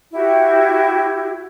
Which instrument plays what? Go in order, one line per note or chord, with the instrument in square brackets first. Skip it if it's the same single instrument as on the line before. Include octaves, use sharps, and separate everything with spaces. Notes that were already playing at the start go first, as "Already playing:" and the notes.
[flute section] E4 F#4 G4